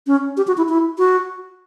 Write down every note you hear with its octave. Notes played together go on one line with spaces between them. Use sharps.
C#4
G4
F#4
E4
E4
F#4